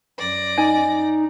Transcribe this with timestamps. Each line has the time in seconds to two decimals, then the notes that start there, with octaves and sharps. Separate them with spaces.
0.18 F#2 D5 A#6
0.58 D#4 G#5